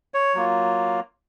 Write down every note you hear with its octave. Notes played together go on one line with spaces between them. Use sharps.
C#5
F#3 A#3 F4